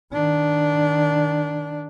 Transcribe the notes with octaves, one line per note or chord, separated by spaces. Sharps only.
D#3 D4